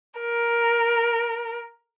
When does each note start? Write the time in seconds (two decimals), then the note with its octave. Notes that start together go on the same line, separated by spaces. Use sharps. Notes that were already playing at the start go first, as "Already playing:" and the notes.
0.20 A#4